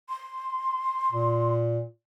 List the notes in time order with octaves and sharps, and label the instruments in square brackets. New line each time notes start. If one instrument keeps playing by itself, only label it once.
[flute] C6
[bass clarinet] A#2